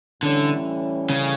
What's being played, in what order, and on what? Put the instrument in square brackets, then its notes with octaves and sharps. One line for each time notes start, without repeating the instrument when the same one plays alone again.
[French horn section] A2 E3 G3 C#4 [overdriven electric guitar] D3
[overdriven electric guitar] C#3